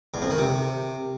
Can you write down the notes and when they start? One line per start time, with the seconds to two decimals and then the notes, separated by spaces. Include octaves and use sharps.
0.14 E2
0.22 F2
0.30 D#3
0.38 C3